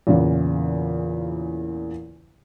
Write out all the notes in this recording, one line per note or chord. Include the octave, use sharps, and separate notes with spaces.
E2 A#2 C#3 E3